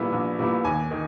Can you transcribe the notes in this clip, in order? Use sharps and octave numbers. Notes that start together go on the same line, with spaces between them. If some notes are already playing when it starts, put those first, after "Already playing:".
Already playing: A#1 A#2 G3 B3 E4
A#1
A#2 G3 B3 E4
D#2 G#5
D#3